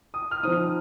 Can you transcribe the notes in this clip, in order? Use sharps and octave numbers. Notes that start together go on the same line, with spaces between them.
D#6
F6
F3 C4 D#4 D#6